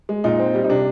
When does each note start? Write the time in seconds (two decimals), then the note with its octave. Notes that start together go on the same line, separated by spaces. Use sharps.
0.09 G#3
0.24 A#2 D#4
0.39 C4
0.55 G3
0.64 D#4
0.69 C3 D4